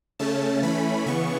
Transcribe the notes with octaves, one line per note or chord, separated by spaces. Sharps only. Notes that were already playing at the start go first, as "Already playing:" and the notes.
C#3 A3 C#4 A5
E3 A3 C#4 B5
C#3 E3 B3 C#6